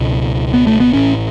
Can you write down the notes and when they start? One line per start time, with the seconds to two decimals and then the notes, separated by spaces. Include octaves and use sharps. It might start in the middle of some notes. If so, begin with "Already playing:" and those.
Already playing: C#2 B2
0.54 B3
0.67 A3
0.80 B3
0.93 A1 A2 C#4